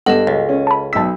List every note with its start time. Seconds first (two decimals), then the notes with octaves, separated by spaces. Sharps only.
0.06 G2 B3 A4 D#5 E7
0.27 C#2
0.49 C#4
0.67 A5 B5
0.93 B1 A5 E6 B6